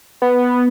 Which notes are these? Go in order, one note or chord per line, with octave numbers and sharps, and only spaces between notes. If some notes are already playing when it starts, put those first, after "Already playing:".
B3